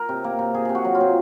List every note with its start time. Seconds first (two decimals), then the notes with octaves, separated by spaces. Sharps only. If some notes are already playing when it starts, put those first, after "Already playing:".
Already playing: A#4
0.09 C3
0.24 A#3
0.39 C3
0.54 C3 G#4
0.65 C3 G#4
0.75 F#4
0.85 F#3
0.95 F4
1.01 C3